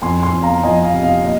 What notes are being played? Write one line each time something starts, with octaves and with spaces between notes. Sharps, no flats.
F2 G#5 C6
G#5 C6
F2
F5 A#5
F3 D#5 G#5
F5
C3
F5
A#2 D#5